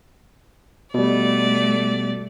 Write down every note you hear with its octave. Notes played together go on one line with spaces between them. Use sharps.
B2 G3 A3 D5